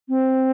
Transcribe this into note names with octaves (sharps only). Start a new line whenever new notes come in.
C4